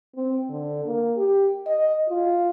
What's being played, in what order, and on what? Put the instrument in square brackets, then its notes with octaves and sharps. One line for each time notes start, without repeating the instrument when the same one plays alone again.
[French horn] C4
D3
A#3
G4
D#5
F4